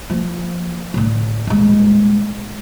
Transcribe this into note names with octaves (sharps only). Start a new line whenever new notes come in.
F3 A#3
A2 D3
D#1 G#3